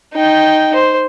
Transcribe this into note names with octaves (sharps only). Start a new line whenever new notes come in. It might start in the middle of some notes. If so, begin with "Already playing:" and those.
D#4 G5
C5